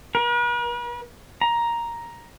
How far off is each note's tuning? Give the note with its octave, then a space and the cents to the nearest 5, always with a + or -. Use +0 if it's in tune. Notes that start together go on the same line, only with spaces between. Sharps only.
B4 -45
A#5 +5